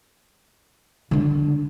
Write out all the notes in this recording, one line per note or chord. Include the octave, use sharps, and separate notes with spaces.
D3 D4